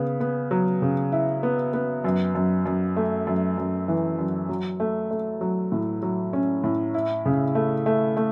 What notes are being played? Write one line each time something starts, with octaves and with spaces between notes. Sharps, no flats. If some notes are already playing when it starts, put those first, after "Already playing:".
Already playing: C#3 B3
B3
F#3
C#3
E4
B3
B3
F#2
F#2
F#2
A3
F#2
F#2
E3
F#2
F#3
A3
A3
F#3
A2
F#3
C#4
A2
E4
C#3
A3
A3
A3